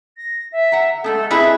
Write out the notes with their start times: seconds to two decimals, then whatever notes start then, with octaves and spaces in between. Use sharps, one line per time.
0.17 A#6
0.52 E5
0.72 F#5 A#5
1.04 G#3 A3 B3 A4
1.31 C4 E4 G#4 B4 D#5 E5 B5